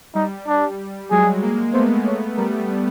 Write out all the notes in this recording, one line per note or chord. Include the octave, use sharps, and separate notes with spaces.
G3 D#4
G3 D4
F#3 G#3 G#4
G#3 A#3
A3 B3 C5
C#5
G3 A#4